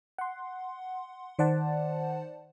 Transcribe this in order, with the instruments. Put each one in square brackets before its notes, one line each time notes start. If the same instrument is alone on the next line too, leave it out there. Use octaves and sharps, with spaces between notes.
[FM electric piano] F#5 C6
D#3 C5 D5 F#5 A5